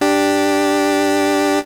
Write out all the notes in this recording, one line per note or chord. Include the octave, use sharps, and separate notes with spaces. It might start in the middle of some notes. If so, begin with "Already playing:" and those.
D4 G4